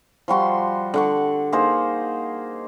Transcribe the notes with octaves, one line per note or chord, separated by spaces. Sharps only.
F3 G3 F#4 C6
D3 F#5 C#6
A#3 D#4 G#4 C5